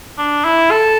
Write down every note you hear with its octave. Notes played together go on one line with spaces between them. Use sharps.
D4
E4
A4